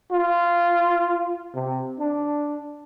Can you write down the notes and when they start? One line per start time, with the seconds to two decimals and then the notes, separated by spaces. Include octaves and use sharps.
0.12 F4
1.54 C3
1.99 D4